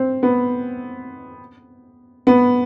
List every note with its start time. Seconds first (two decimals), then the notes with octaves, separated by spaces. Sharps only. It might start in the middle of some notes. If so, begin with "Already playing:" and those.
Already playing: C4
0.23 B3
2.27 B3